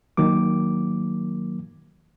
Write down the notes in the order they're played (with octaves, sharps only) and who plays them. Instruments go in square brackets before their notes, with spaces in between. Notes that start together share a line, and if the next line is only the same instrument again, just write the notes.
[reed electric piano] D#3 F#3 A#3 D6